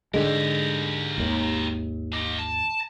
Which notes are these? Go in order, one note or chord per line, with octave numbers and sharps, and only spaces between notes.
G#2 D3 G#3 G4 A#4
G#1 D#2
G4 D#5
A5